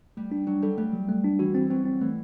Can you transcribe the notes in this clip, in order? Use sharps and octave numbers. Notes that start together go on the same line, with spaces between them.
G3 A3
D4
F#3 D4
G3 A4
G3 A3
F#3
A3
D4
E3 F#4
E3 C4
F#3 C4
C4
E3 A3